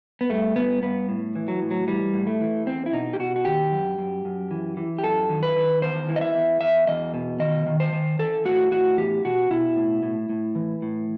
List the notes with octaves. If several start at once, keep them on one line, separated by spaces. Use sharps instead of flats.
B3
G2 A3
G2 B3
G2 B3
A2
E3
F#3
A2
F#3
E3 G3
A2
A3
E3
E2 C4
E4
B2 D#4
G4
B2 F#4
F#4
D#3 G4
F#2
F#2
F#2
E3
E3
G4
F#2 A4
D#3
B4
D#3
E2 C5
E3
D#5
E5
E2
E2 E5
E2 D#5
B2
D#3 D#5
D#3
C5
D#3
E3 A4
A2 F#4
A2 F#4
E2 G4
B2 F#4
B2 E4
A2
A2
A2
E3
A2